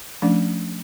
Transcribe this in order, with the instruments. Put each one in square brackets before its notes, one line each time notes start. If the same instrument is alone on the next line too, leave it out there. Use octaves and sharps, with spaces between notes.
[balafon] F3 A3 C#4 D4